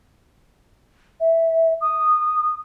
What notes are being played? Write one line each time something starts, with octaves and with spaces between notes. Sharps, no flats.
E5
D#6